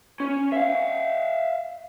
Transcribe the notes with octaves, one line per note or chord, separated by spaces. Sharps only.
C#4
E5 F5